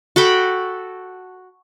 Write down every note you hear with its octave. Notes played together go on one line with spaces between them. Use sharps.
F#4 A4 G5 B5